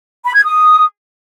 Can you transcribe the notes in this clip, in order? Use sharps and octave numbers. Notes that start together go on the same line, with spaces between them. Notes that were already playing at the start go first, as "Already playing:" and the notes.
B5
G#6
D#6